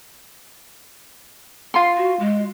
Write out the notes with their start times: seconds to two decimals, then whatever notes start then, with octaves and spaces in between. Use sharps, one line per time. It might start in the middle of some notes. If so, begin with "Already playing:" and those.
1.74 F4 C6
1.97 F#4
2.20 G#3